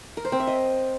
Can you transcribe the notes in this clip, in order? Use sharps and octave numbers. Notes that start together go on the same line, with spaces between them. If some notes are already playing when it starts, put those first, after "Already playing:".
A#4
C5
C4
E5
D#5